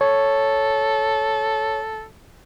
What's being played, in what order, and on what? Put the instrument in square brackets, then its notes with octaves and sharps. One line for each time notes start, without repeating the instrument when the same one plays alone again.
[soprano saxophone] A4 [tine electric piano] C#5